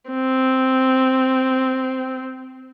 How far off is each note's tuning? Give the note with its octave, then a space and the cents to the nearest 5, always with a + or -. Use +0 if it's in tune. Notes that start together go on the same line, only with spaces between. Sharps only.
C4 -5